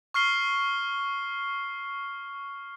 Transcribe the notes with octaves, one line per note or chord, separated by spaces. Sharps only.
C#6 F6 C7 G7